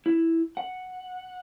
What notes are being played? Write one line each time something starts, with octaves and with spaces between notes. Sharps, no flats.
E4
F#5